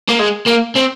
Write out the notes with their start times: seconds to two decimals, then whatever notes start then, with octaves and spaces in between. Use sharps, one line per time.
0.09 A#3
0.19 G#3
0.47 A#3
0.76 C4